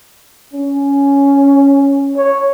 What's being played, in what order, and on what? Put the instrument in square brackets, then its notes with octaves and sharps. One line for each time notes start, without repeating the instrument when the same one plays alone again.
[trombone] C#4
[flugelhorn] C#5